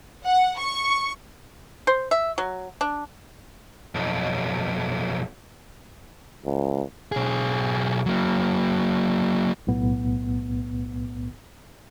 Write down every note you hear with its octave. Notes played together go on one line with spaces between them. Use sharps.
F#5
C#6
C5
E5
F#3
D4
B1 F2
C#2
B1 G#4
F#3 A#3
B1 A2 B3